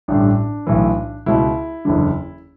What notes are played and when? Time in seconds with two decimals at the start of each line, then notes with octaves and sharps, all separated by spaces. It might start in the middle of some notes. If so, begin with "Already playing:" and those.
0.08 A1 G2 D3 D4
0.67 B1 A2 E3
1.26 C#2 B2 E4
1.85 F#1 E2 D3